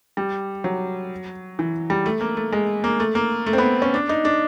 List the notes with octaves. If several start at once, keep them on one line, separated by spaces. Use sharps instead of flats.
G3
F#3
E3
G3
A3
A#3
A3
G#3
A#3
A3
A#3
A3
C4
B3
C#4
D4
D#4
D4